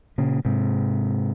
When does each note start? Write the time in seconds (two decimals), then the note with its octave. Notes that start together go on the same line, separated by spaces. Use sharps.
0.18 A#2 C#3
0.45 G#2 C3